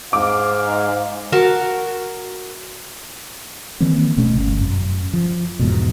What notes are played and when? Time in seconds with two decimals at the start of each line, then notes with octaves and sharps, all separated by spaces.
0.13 G#2 F5 D6
1.32 F#4 A#4 A5
3.80 D#3 E3 A#3 C4
4.17 D1 B2 A3 C#4
4.36 G1
4.61 F#2
5.13 F3
5.59 E2 G#2 B2